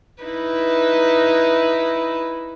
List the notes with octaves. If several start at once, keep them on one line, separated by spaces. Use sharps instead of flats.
D#4 E4 B4